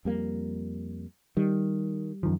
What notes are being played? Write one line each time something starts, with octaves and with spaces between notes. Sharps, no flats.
F2 G3 A#3
D#3 G3
F#2 D#3 F3